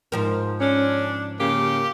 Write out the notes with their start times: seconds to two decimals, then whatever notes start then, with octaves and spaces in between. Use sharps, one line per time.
0.12 G#2 F3 A#4
0.60 C#4 D4
1.40 C#3 A#3 G4